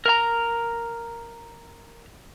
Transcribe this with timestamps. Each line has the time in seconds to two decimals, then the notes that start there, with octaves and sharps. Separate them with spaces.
0.06 A#4 A#5